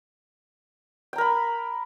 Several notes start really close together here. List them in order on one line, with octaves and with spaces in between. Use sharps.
G5 A#5 A#4 B5